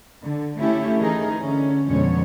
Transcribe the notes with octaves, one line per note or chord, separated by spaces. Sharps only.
D3
A3 C#4 E4 G4 A4
D#3 E3 D#4 G#4 A#4
D3 C#4
F2 B2 D3 G#3 C#4 C#5